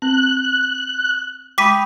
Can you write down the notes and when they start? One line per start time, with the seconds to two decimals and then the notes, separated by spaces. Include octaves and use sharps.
0.02 C4 F#6
1.58 G#3 G5 B5 D6 D#6 B6 D#7